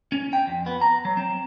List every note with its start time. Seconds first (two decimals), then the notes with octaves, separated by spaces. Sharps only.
0.12 C#4
0.33 G5
0.47 F2
0.66 B3
0.81 A#5
1.05 F#3
1.17 C4